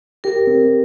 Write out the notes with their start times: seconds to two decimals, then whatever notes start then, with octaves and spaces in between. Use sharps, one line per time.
0.24 G4 A#4
0.47 C4